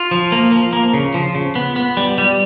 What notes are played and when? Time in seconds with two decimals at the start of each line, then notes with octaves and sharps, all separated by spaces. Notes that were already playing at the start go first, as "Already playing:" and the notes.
Already playing: F4
0.11 F3
0.32 A#3
0.52 F3
0.73 A#3
0.94 C#3
1.14 F3
1.35 C#3
1.55 B3
1.76 B3
1.97 G3
2.18 G3